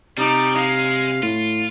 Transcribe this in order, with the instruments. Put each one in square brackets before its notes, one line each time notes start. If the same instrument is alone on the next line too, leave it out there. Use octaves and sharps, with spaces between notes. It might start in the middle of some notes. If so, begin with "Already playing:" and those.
[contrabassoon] C3 [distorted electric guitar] G3 [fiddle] D#4 D6
[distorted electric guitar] G#3 [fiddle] F5
[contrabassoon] A2 [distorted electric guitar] F4